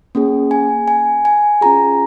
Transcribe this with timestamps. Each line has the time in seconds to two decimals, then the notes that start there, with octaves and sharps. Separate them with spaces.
0.15 A#3 C#4 G#4
0.51 G#5
0.88 G#5
1.25 G#5
1.61 C#4 F4 G#4 A#5